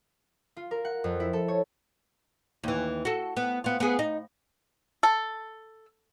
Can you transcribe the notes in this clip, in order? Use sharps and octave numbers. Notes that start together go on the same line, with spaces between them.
F4
A#4
F#5
F2
E4
A4
C#5
D#2 E3
F#4 A4
B3
B3 F4
B3 G#4
D#4
A4